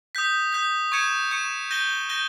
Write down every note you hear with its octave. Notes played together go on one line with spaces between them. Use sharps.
D#6 G6 B6
D#6 G6 B6
C#6 G#6 C#7 E7
C#6 G#6 C#7 E7
G6 A#6 D#7 G7
G6 A#6 D#7 G7